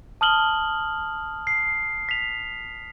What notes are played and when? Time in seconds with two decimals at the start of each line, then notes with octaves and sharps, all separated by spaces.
0.21 A5 D#6 F6 F#7 G7
1.47 C7
2.09 B6 F7